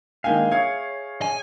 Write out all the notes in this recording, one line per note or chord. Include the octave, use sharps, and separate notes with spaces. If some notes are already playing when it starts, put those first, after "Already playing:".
D#3 G#3 A#3 D4 F5 G5 G#5
G#4 C#5 E5 F5 G#6 C7
G#5